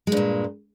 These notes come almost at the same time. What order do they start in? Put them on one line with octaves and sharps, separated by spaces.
G#3 G2 A#2